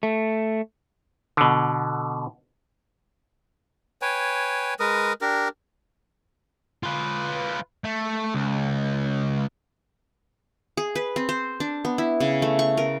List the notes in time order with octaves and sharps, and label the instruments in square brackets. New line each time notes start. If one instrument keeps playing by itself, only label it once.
[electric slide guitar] A3
[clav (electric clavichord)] B2 D3
[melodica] B4 C#5 G5 G#5
G#3 A#4 B4 D#6
D4 G4 A#4
[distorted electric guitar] F4 B4
A3
C#2
[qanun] G#4
B4
C4
C5
D4
B3
E4
C#3
A3
C#6
A#4